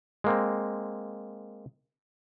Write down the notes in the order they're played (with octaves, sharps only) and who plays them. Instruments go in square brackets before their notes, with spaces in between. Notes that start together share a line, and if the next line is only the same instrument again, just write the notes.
[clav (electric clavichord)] G#3 A#3 C4